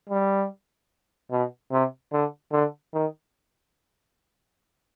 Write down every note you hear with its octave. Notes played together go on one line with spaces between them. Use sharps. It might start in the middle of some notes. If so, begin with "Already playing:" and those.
G3
B2
C3
D3
D3
D#3